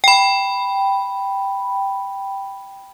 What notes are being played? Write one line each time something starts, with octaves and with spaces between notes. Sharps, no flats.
G5 B5